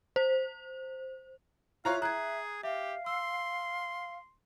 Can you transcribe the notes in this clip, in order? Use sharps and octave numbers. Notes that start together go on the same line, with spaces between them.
C5
E4 F4 C#5 E5 F5 A#5 F#6
G#4 A#5 F#6 G#6
G4 E5 F5
C6 E6